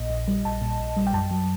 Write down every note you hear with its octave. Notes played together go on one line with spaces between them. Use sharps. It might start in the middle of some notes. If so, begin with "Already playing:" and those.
Already playing: A#1 A#2 D#5
A#1
G3
A#1 A5
A#2
A#1
G3
G5
F#2 A5
F#3